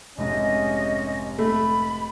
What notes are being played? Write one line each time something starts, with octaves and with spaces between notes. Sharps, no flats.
F1 G#2 C3 C#4 D#5
A3 B5